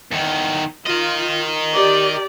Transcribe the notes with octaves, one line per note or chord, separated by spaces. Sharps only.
E2 D#3
F4 A#4 D#5
G4 D5